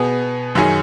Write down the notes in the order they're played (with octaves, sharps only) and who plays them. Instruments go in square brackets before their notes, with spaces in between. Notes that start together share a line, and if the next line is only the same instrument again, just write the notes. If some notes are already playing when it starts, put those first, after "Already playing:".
Already playing: [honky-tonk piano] B2 B3 G#4
F#2 D#3 F#3 C#4 G#4